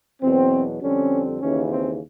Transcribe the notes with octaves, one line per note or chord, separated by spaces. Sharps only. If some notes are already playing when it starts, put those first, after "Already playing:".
E2 B2 F#3 C4
F2 D3 G3 C4 C#4
D#2 C#3 E3 C#4
C4